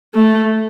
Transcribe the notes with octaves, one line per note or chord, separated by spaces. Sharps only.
A3